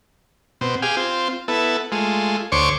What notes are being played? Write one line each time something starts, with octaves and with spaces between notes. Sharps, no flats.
B2 C4
G4 G#4 F5
C4 F4
B3 E4 A4
G#3 A3 F4
D2 C5 C#5 C#6 D6